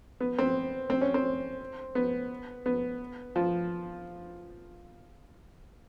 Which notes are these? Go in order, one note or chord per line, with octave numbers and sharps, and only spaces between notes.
B3
C4
C4
C#4
C4
B3
B3
F3